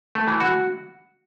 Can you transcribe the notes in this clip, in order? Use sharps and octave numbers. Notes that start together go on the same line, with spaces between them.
A3
E3
F#4